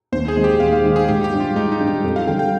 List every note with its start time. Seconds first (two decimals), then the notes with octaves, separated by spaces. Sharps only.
0.12 D#2 C5
0.28 G#4
0.36 D#3 G#3
0.44 G4
0.60 D#2 F5
0.73 F5
0.84 D#3 G#3
0.96 G#4
1.08 G#2 G4
1.24 G4
1.32 G3 D4
1.40 F4
1.55 G#2 D#4
1.72 D#4
1.80 G3 D4
1.87 G4
2.03 F2
2.16 F5
2.27 D3 G5
2.31 G3
2.39 G5